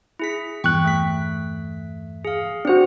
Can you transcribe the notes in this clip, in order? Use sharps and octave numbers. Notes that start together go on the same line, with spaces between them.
E4 G#4 B6
E2 G2 G5 C#6 F#6
A3 B6
G#4 F5
C4 D4 F#4 C5